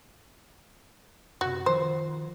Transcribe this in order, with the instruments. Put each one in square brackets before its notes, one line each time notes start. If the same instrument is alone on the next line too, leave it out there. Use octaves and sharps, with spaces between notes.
[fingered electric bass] F#2 C3 [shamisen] F#4
[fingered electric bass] D#3 F3 [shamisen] C5